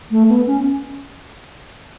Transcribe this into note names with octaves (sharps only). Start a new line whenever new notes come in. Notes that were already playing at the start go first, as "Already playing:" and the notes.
A3
B3
C#4